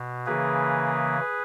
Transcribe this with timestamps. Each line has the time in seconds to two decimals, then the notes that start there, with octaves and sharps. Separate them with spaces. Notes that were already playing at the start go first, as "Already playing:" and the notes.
Already playing: B2
0.26 C#3 E3 A#3 G#4 B4